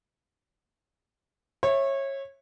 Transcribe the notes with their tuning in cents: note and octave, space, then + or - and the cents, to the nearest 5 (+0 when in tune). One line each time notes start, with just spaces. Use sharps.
C#5 -25 E5 +0